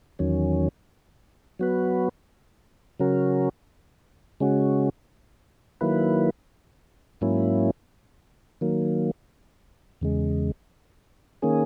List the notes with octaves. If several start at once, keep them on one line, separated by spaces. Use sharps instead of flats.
E2 D#3 F#3 C#4
F#3 B3 F#4 B4
C#3 F#3 C#4 F#4 A#4
C#3 G#3 C#4 F#4
D#3 F#3 A#3 E4 B4
G#2 F#3 A#3 C#4 E4
D#3 F#3 A#3
E2 C#3 G#3
D#3 A#3 C#4 G#4